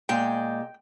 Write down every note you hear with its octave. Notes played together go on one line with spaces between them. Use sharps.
A#2 G#3 G5